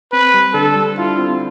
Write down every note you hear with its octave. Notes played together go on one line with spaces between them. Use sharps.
C4 B4
G3
D3 A4
G3
E4 F4
C4